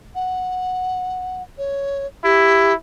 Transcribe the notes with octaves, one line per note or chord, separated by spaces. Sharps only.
F#5
C#5
E4 G4